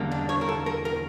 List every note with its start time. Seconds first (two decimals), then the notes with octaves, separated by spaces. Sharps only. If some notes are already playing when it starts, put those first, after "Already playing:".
Already playing: E2 D3 G3 A#3
0.11 D4
0.29 C#5
0.41 A#4
0.49 A4
0.66 A#4
0.85 A#4